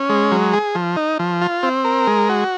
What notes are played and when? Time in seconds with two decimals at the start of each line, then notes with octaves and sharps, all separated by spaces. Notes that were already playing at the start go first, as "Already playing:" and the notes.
Already playing: C#4
0.09 G#3
0.32 F#3
0.53 G#4
0.75 F3
0.97 D#4
1.19 F3
1.42 F4
1.63 C4
1.85 A#4
2.07 G#3
2.29 F#4